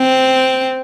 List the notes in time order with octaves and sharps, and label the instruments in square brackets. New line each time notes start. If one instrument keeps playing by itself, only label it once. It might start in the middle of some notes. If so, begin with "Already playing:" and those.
Already playing: [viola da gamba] C4